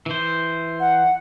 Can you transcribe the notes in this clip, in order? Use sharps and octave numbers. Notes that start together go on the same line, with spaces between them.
E3 C5
F#5